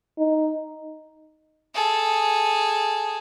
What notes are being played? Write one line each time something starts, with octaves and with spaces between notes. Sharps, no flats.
D#4
G#4 A4